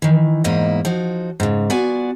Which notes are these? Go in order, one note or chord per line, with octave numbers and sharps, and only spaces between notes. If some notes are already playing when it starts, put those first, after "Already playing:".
D#3 E3
E2 G#2 A#3 E4 D#5
F3 D#4 F#4
G#2 C#3
B3 F4 F#4 D5 G#5